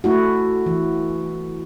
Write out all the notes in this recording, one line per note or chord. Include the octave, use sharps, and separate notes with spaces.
A3 E4 F#4
E3